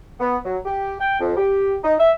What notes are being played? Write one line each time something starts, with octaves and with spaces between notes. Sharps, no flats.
B3
F#3
G4
G5
F2
G4
D#4
E5